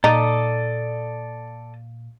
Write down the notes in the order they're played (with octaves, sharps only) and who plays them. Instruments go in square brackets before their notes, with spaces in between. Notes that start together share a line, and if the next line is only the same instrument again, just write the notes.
[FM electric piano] A#2 [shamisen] D#4 [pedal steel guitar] A4 D5 D#6